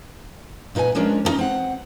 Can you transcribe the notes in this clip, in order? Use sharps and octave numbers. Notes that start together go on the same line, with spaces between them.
A#2 D#4 A#4 B4 G#5
F3 G#3 C#4 D4 A#4
D3 C#4 D#4
C4 F#5